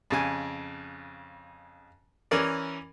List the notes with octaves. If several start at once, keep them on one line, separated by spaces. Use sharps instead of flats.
F2 C#3 G#5
E3 C#4 A#4 D5